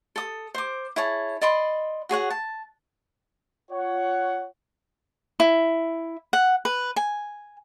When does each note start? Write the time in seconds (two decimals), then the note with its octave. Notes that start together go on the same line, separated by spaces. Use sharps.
0.16 A4 D#6
0.54 C5 D6
0.96 E4 G#4 C#5 A5
1.41 D5 D#5 B5 C6
2.09 F#4 G#4 C#5 F#5
2.30 A5
3.71 F4 C#5 F#5
5.40 E4
6.33 F#5
6.65 B4
6.96 G#5